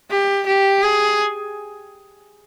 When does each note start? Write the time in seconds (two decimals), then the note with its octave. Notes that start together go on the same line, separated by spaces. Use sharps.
0.10 G4
0.47 G4
0.83 G#4